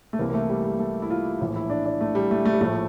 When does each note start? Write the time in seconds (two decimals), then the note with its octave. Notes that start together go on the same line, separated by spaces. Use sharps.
0.13 A3
0.19 C2 C3 E3 A#3
0.30 A#3
0.34 A3
0.49 G3
0.64 G3
0.79 A3
1.02 E4
1.10 F4
1.40 A#1 A2 E3
1.56 E4
1.70 D4
1.85 D4
2.01 A3
2.15 G3
2.31 A3
2.45 A3
2.53 G3
2.61 A#1 A2 F3 A3